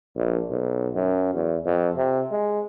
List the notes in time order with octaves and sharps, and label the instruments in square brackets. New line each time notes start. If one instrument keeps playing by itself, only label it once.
[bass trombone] A#1
B1
F#2
E2
F2
C3
G#3